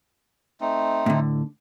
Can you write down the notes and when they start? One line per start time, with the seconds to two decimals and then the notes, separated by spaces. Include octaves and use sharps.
0.61 A3 C4 D#4
1.06 A2 D3